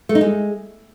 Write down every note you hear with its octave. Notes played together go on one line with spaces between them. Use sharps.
A3
D#4
G#3